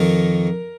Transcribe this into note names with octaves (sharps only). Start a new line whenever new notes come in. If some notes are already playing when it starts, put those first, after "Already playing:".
Already playing: F2 D#3 A#4